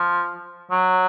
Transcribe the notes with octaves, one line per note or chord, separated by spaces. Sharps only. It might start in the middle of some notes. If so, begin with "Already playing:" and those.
Already playing: F3
F#3